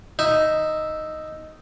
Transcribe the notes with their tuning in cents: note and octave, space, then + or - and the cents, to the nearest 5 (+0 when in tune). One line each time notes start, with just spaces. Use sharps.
D#4 +0 E5 +0